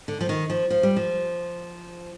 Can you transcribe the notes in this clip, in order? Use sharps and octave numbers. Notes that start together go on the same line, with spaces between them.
D3
F3
D#3
F3
F3
G3
F3